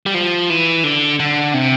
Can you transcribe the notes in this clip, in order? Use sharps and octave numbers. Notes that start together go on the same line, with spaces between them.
G3
F3
E3
D3
D3
C3